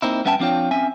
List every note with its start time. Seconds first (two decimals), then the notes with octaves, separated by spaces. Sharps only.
0.02 A#3 C4 D#4 E4
0.25 G2 B3 C#4 E5 G5 A5
0.40 F3 C4 D4 F4 C#5 G5
0.71 C4 C#4 E5 G#5